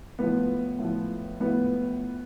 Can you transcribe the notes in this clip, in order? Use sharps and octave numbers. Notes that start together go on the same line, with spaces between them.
A2 F3 B3
A2 F3
A2 F3 B3